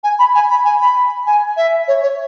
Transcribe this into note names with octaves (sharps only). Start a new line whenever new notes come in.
G#5
B5
G#5
B5
G#5
B5
G#5
E5
C#5
C#5